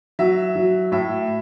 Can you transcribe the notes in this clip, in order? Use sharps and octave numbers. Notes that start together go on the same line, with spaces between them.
F#3 E5
F#3
A2 E5